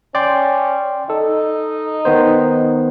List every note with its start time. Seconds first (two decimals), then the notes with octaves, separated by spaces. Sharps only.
0.15 C#4 D5 G5 C6
1.10 D#4 A4
2.05 D#3 B3 C5